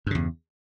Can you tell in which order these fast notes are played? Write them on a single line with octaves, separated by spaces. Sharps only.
G2 C#3 E2